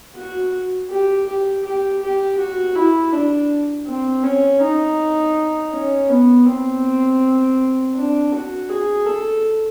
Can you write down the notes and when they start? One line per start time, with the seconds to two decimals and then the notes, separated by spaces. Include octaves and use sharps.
0.16 F#4
0.90 G4
1.27 G4
1.65 G4
2.02 G4
2.38 F#4
2.76 E4
3.13 D4
3.87 C4
4.24 C#4
4.62 D#4
5.73 C#4
6.10 B3
6.46 C4
7.96 D4
8.32 F#4
8.70 G#4
9.06 A4